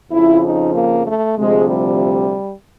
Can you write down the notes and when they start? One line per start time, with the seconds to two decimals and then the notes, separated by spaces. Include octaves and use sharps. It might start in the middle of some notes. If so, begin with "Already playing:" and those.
0.12 F2 C#3 F3 E4
0.44 D#4
0.74 A#3
1.06 A3
1.37 D2 C3 F3 G#3
1.69 G3